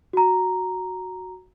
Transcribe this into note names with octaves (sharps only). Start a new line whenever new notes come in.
F#4 A#5